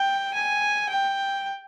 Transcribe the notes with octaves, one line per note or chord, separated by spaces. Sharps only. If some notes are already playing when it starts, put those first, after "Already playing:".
Already playing: G5
G#5
G5